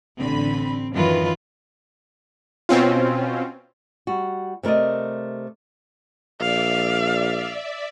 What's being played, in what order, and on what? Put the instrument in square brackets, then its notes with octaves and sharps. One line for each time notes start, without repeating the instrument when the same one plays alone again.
[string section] A1 D3 B5 [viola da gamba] C4
[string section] F#2 D#3 F#3 [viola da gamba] E3 F4 B4
[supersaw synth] B2 C4 C#4 F4
[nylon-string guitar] G3 F#4
C3 A3 A#4 D5 D#5
[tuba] A#1 [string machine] D5 E5 [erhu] F5